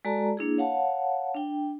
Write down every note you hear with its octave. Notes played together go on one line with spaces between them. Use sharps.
G#3 F#4 A4 D5 A5 A#5
A#3 D4 E4 G#4
C#5 F5 F#5 A5
D4 G5